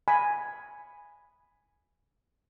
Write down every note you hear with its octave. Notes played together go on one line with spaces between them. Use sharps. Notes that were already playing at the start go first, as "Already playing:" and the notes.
G#5 B5